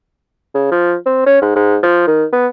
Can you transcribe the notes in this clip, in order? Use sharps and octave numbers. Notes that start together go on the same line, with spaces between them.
C#3
F3
C4
C#4
G#2
G#2
F3
D#3
B3